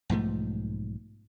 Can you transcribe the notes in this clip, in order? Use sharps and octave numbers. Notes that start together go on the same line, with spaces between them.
B1 G#2 F3 A3